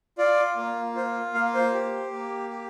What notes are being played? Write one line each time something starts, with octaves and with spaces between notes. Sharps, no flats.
F4 D5
A#3
F4 C5
A#3 F5
C5
G4
A#3
G4